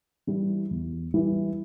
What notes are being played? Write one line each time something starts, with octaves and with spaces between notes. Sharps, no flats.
E3 G3 E4
E2
E3 G3 E4